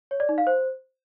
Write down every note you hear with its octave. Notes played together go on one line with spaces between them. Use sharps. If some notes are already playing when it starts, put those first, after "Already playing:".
C#5
D5
D#4
F5
C5